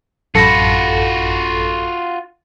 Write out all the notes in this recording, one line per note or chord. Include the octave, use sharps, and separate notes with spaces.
A1 F#2 F4 F#4 A4 B5 A#6 C#7